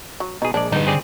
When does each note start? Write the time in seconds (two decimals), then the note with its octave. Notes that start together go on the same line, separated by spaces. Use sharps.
0.20 F#3
0.42 B2 D#4 G#4
0.54 A#1 G#3 D4 D5
0.72 D3 G3 D#4 B4
0.87 C4 G#4 D5